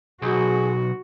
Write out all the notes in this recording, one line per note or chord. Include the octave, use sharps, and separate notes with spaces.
B1 F#4 G#4